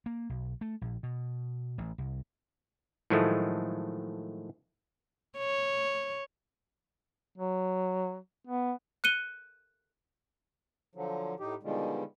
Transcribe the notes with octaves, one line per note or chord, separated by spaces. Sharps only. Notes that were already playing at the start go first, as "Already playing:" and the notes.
A#3
B1
A3
A#1
B2
A1
C2
A2 D#3 F3 F#3 G#3 A3
C#5
F#3
B3
F#6 C#7 D#7 G7
D3 F3 F#3
A2 D#4 G4
B2 D3 D#3 F3 G3 G#3